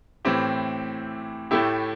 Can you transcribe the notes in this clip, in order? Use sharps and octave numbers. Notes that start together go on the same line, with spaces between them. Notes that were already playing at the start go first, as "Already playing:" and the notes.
A2 E3 C4 E4 G4
A2 A3 E4 G4